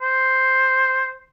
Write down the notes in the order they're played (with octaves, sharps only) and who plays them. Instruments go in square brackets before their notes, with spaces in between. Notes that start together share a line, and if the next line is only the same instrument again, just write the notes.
[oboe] C5